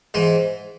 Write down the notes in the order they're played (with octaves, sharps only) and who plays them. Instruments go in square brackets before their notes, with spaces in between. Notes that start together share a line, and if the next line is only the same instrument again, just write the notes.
[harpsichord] G#2 E3 C5